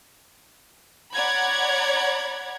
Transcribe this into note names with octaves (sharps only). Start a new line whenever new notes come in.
C#5 D5 F#5 A#5 B5 G#6